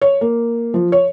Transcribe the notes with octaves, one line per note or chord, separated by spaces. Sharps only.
C#5
A#3
F3
C#5